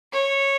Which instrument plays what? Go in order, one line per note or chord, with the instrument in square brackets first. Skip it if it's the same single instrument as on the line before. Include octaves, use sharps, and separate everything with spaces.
[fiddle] C#5